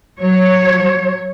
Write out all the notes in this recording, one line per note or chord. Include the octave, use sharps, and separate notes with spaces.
F#3 C#5